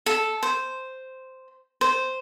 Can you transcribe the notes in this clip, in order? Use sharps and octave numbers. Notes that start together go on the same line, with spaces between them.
A4
C5
C5